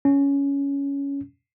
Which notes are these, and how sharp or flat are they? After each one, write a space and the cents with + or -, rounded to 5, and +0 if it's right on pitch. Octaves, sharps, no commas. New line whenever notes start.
C#4 +10